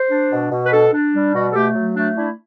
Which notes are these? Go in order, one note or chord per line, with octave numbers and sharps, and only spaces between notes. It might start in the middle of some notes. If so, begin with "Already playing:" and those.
Already playing: C5
D4
B2
B2
B4
D4 A4
D4
G3
B2 F#4
A4
A3 G4
F#3
A3 D4
D4 E4